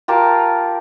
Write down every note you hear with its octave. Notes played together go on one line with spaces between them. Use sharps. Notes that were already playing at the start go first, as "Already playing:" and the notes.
F4 G4 A#4 A5